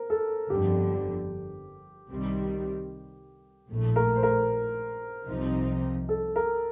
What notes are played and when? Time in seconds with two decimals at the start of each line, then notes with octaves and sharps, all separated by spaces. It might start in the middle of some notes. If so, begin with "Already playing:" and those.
Already playing: A#4 C5
0.10 A4
0.50 G1 F2 D3 G4
2.10 C2 C3 D#3 G3
3.69 A#1 A2 A3
3.96 A#4
4.16 C5
4.23 A#4
5.29 C2 C3 F3 C4 D#4
6.09 A4
6.36 A#4